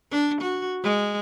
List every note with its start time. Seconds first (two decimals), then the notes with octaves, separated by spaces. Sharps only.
0.11 D4
0.41 F#4
0.83 G#3